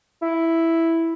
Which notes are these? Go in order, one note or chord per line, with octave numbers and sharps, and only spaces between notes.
E4